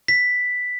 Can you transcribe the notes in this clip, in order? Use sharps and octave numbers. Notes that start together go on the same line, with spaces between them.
B6